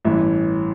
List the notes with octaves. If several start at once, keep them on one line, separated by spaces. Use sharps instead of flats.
A1 G2 E3 E5